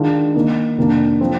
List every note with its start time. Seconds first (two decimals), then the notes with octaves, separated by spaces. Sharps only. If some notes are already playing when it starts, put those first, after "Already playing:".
Already playing: D#3 G#3 D4 F4
0.35 D#3 A#3 D#4
0.77 F2 C3 D#3 A#3 D4
1.21 F3 C4